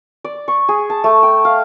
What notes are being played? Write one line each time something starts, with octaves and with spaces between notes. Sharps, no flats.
D5
C#6
G#4
A5
A3
G5
F5